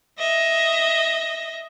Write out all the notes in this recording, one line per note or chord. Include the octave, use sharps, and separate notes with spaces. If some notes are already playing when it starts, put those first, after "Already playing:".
D#5 E5